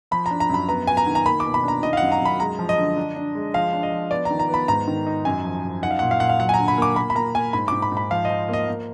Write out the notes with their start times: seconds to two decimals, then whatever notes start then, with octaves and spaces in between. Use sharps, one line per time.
0.11 F3 B5
0.26 A#5
0.31 D4
0.40 A#5
0.49 F#2 B5
0.69 B3 A#5
0.87 B3 G#5
0.97 A#5
1.07 D#3
1.15 A#5
1.26 A#3 B5
1.40 B2 D6
1.54 B5
1.64 D4 A#5
1.83 D#3 D#5
1.93 F5
1.97 F#2 F#5
2.12 A#5
2.21 F#2 B5
2.40 G#3 A#5
2.59 F3
2.69 D#5
2.78 D3
2.97 D4
3.16 D4
3.35 G#3
3.54 F3 F5
3.73 D4
3.83 D#5
3.92 F3
4.11 B3 D5
4.25 A#5
4.30 D#3
4.39 A#5
4.49 B3 B5
4.68 G#2 A#5
4.88 D#3
5.06 D#4
5.25 F#2 G#5
5.45 F3
5.64 F#2
5.82 D#4 F#5
5.91 F5
5.99 A#2 F#5
6.11 F5
6.20 A#2 F#5
6.29 F5
6.39 F#3 F#5
6.49 G#5
6.54 D3 A#5
6.68 B5
6.78 A#3 D6
6.96 A#3 B5
7.10 B5
7.15 A#3 A#5
7.35 A#3 G#5
7.53 G#2 B5
7.68 G#2 D6
7.82 B5
7.92 G#2
7.97 B5
8.11 F3 F5
8.25 D#5
8.30 F3
8.49 A#3 D#5
8.68 A#3